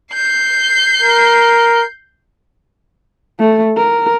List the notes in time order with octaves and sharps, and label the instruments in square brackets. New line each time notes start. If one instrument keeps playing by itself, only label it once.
[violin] G6 C7
[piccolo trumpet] A#4
[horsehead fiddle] A3
A#4